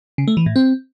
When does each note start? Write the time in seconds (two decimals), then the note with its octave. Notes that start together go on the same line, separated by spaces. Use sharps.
0.18 C#3
0.28 A3
0.37 E3
0.46 A2
0.56 C4